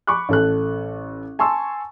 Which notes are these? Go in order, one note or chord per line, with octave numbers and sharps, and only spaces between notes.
B5 C#6 D6 F#6
A1 A4 F#6
G#5 A5 C6 C#6 E6